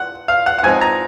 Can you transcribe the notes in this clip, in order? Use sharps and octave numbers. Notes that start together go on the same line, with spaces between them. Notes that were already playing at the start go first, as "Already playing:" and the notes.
Already playing: F#5
F5
F#5
F#5
G#2 F3 C4 D#4 G#5
A#5